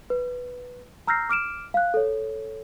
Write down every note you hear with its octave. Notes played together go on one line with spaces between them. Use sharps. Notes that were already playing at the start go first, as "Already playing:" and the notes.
B4
A#5 E6 F6 G6 A#6 C7
D6 F6 D7 E7
F5 F#6
A4 C#5